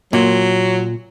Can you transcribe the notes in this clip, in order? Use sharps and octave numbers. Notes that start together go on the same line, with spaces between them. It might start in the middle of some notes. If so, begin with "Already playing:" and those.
A#2 F#3